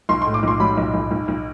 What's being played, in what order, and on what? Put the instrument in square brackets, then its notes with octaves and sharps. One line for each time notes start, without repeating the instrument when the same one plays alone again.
[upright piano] B1 C6
A2 C6
D6
B1 C6
F#3 B5
B1
B1
B1
B1